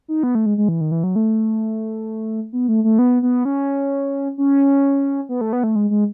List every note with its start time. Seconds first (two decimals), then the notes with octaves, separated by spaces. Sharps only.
0.08 D#4
0.23 B3
0.35 A3
0.46 G#3
0.58 G#3
0.69 E3
0.81 D#3
0.92 E3
1.04 F#3
1.16 A3
2.53 B3
2.68 A3
2.84 A3
2.99 B3
3.23 B3
3.45 C#4
4.38 C#4
5.29 B3
5.41 A3
5.53 B3
5.64 A3
5.76 G#3
5.90 G#3